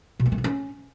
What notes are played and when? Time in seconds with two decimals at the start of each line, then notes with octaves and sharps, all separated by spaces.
0.19 B2
0.26 A#3
0.32 G#3
0.38 B3
0.44 C#4